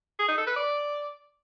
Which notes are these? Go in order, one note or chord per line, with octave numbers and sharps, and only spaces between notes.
G#4
D#4
A4
B4
D5